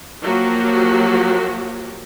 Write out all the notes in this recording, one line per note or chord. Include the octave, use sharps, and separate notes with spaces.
F3 F#3 A#3 F#4 G4